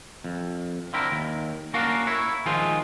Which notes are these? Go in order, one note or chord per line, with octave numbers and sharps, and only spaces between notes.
F2
D3 C4 E4 A#4
D#2
A#3 C#4 D4 F#4 A#4 F5
E4 C#5
D#3 F3 G#3 F4 G#4 C5